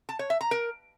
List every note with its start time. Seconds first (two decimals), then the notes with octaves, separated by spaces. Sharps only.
0.09 A5
0.19 C#5
0.30 E5
0.41 A#5
0.51 A#4